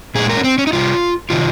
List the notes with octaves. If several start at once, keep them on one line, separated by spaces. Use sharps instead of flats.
A#2 G#3 G#4
A#4
C#4
C4
C#4
D#4
C3 G3 F4
C3 D#3 G3 F4